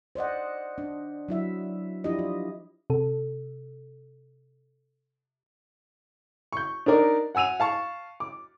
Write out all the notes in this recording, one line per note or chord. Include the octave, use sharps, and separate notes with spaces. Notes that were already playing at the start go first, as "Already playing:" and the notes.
C5 D5 D#5 F#5
D4
F#3 E4 E5
F3 D4 E4 F4 G4 D#5
F4
C3 A4
C#6 G6
D4 D#4 A#4 D5
F#5 G#5 E6 D#7 F7
F5 A5 C#6
D6